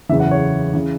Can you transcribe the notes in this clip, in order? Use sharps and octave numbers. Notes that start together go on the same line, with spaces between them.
F#1 E2 C#3 E3 E5
F#5
C#5
C#3 E3